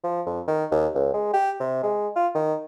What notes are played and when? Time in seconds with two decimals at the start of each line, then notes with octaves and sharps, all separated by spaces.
0.04 F3
0.26 F2
0.48 D#3
0.71 D#2
0.95 C#2
1.14 G#3
1.34 G4
1.60 C3
1.83 G#3
2.16 F4
2.35 D#3